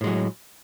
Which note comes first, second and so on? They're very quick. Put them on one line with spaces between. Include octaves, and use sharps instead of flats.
A2 G#3 F#3